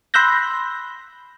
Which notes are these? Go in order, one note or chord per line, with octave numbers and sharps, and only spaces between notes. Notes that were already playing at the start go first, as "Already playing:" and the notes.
B5 C6 E6 F#6 G6 A#6